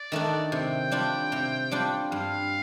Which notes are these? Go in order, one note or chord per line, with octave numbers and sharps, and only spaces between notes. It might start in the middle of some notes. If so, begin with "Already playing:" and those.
Already playing: D5
D#3 A3 D4
C3 G5
G3 D4 F4
C3
G3 D4 F4
G2 F5